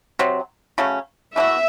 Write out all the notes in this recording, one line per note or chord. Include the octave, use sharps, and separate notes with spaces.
C3 F#3 C4
C#3 F#3 A3 C#4
E3 A3 D#4 F#4 E5